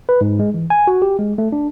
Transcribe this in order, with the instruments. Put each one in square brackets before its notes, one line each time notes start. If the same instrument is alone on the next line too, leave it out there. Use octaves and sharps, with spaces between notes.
[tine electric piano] B4
G#2
G#3
E3
G#5
F#4
G4
G#3
A3
D4